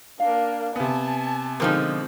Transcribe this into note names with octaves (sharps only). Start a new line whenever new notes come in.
A#3 D4 F5
C3 B3 G#5 A5
B2 D3 F3 G#3 C4 D#4 A#4